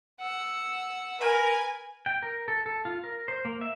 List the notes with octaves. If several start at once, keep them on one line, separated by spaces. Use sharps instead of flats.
F#5 E6
A#4 B4 G#5
G5
A#4
A4
A4
F4
A#4
C5
A#3
E5